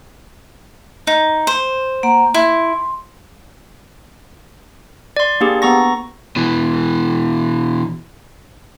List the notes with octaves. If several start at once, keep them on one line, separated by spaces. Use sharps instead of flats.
D#4
C5
A#3 F#5 A#5
E4 C6
D5 C6
A#3 D4 G4 G#4
B3 A#5 C#6 A#6
B2 E3